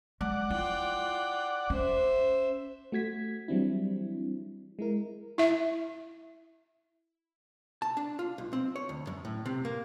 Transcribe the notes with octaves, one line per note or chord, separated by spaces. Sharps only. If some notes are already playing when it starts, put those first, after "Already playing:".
G#3 D5 F#5
E4 F4 G5
C#4 C5 E5
A3 F#4 G#6 B6
E3 F#3 G3 C4 D4 E4
G#3 E4 A#4
E4 E5
A5
D4
F4
B1
C4
C#5
D2
F#2
A2
C3
A#3